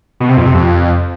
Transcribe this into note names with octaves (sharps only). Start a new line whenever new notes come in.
B2
C3
F2
C3
F2